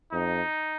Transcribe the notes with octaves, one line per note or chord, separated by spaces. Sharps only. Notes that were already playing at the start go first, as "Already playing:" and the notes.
F2 D#4